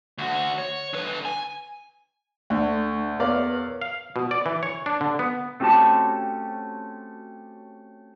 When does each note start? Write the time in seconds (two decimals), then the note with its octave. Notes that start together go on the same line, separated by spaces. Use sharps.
0.18 D2 F#4
0.58 C#5
0.94 D3 B4
1.25 G#5
2.50 D2 A3 D4
3.20 E2 A#4 B4 C#5 D5 F5
3.81 F5
4.16 B2
4.31 D5
4.46 E3
4.63 C#5
4.86 D4
5.01 D3
5.19 B3
5.60 A3 C4 C#4 F#4 G4 A5